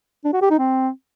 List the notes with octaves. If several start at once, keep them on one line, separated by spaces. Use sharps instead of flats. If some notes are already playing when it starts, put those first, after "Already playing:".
D4
F#4
G4
D#4
C4